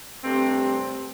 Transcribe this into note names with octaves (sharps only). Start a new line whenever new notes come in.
G2 C3 A3 C4